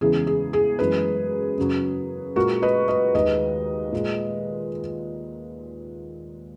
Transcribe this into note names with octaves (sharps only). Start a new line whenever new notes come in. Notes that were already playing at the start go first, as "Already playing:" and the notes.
E2 C#3 E3 G#3 G#4
G#4
G#4
F#2 E3 G#3 G#4 B4
F#2 C#3 F#3
A#2 G#3 F#4 A#4
B4 D#5
B4 D#5
D#2 D#3 G#3 B4 D#5
A#2 G#3